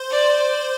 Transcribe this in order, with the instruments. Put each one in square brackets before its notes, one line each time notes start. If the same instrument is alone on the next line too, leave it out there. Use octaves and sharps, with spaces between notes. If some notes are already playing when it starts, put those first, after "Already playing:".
Already playing: [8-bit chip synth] C5
[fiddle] D5